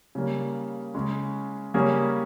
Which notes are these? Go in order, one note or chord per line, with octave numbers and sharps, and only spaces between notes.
C#3 G3 A#3
C#3 G#3 C#4
C#3 G3 A#3 C#4 G#4